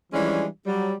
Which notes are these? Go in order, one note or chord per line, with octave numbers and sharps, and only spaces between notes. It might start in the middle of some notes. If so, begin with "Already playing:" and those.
E3 F3 G3 G#3 C#4 D4
F#3 G3